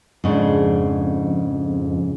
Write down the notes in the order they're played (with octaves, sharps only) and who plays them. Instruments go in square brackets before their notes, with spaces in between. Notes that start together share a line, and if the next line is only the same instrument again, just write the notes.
[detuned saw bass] F2 [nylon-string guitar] G#2 C#3 D4